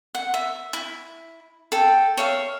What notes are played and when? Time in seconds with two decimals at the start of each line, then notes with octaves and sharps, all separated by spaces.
0.15 F#5
0.34 E5
0.73 E4
1.72 A4 G5
2.17 C#5 E5 F5